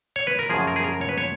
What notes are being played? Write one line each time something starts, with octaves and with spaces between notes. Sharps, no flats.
C#5
B4
A#4
F#2 C#3 F3 G#4
A#4
G#4
A#4
C#5
B4
C#5